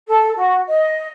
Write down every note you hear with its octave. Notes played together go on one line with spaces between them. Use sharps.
A4
F#4
D#5